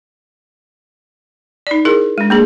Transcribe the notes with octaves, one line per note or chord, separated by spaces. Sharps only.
D#4 D5
E4 G#4 A#4
G#3 D4
A#3 D4 G#4